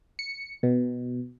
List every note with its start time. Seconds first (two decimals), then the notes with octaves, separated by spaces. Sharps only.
0.19 C#7
0.63 B2